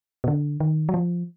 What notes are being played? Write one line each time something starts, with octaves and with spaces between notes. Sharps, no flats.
B2
D3
D#3
F#3
F3